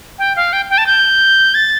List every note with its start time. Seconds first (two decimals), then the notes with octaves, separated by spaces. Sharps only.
0.19 G5
0.36 F5
0.53 G5
0.70 G5
0.78 A5
0.87 G6
1.55 A6